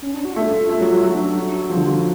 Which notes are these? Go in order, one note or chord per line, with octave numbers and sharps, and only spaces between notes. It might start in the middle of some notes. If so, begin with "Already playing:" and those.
C#4
D4
F#4
F4
A3 D4
F4
A3
F#3
F#3
F#3 F#4
D4
D4
F#4
F#4
F3
D3
F3